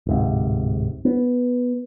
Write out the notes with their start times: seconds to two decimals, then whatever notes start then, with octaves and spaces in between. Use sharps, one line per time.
0.07 D1 G#2 C3
1.05 B3